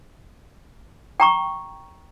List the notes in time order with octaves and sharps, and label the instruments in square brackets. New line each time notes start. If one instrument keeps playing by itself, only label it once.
[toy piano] G5 A#5 C#6